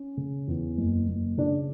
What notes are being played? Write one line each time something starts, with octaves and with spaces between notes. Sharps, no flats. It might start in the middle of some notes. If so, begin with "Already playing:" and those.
Already playing: C#4
C#3
E2
F#1
F#1
C#3 D4